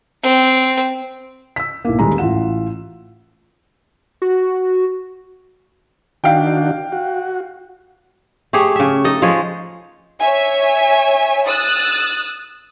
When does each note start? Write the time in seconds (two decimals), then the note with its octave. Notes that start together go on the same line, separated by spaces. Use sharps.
0.24 C4
1.56 E6 B6
1.85 B1 A2 A#3
1.99 D#1 D#3 G3 G#3 A#5
2.18 A1 E3 F4 F#5 E7
4.22 F#4
6.24 D#3 D4 F#4 F5 G5
6.92 F#4
8.53 A3 G4 G#4 C#5
8.76 C#3 E5
9.04 D#4 A4 D#5
9.22 F3 G#3 G#4 C#5
10.20 C#5 E5 G#5
11.47 D#6 E6 F#6 A6